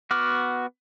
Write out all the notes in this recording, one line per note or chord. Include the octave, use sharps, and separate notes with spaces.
B3 F#4 D6 F6